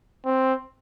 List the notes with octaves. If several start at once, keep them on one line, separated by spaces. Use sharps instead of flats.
C4